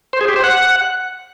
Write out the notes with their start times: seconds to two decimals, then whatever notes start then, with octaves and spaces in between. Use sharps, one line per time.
0.13 C5
0.21 G#4
0.28 G4
0.36 C5
0.44 F#5